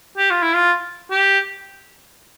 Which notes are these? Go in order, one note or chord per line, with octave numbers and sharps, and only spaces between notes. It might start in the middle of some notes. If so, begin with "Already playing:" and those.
G4
F4
E4
F4
G4